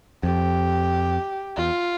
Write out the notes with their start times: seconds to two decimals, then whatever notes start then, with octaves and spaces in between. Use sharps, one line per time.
0.23 F2 G4
1.57 E2 F4